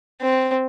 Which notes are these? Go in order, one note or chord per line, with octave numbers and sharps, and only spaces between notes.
C4